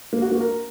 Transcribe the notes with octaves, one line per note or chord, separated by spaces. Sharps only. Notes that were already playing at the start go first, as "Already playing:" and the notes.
A#3
F#4
A#3
A#4